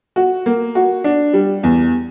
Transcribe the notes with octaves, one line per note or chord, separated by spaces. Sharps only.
F#4
A#3
F#4
D4
G3
E2